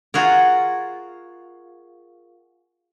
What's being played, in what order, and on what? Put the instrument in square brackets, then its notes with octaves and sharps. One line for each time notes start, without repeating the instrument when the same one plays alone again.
[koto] F4 F#4 G#4 A#4